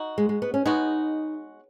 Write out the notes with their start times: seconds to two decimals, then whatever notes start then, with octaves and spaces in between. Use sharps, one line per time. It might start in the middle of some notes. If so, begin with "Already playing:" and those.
Already playing: D#4 F#4
0.18 G#3
0.29 G#3
0.42 B3
0.54 C#4
0.66 G#3 B3 D#4 F#4